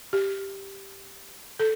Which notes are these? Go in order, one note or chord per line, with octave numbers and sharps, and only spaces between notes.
G4
A4